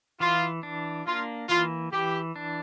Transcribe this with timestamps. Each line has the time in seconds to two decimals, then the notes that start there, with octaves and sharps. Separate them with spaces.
0.20 E3 F4
0.63 D4
1.06 A#3 F4
1.49 E3 F4
1.92 E3 G4
2.36 D4